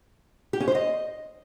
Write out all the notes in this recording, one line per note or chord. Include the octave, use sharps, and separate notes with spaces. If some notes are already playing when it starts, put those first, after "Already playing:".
G4
C#4
C5
D#5